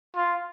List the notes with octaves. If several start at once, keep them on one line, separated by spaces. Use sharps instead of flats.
F4